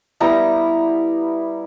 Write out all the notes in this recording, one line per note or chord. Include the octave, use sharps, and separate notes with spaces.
G3 B3 E4 A#5